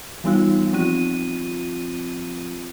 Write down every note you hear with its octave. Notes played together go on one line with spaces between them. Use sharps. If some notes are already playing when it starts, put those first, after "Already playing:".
E3 G3 B3 D#4 F4
F3 C4 F4 D#7